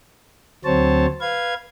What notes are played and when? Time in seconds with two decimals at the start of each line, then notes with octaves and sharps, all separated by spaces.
0.65 D2 F#3 C4 C5 C#5 A5
1.21 B4 F5 G#6